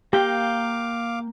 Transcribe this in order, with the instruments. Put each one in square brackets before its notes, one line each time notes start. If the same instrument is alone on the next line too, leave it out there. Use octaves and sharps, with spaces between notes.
[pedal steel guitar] A#3 G5 [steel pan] G4 [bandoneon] F5 D6